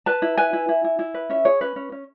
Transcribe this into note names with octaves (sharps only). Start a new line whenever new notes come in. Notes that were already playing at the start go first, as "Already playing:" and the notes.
B4 A5
E4
B4 G#5
E4
E4
E4
E4
B4
C#4 E5
G#4 C#5
C#4 B4
C#4
C#4